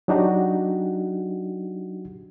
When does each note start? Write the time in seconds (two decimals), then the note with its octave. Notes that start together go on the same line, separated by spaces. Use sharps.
0.08 F#3 D4 D#4 F#4 G4